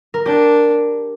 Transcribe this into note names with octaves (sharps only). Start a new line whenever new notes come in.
A#4
D4 G4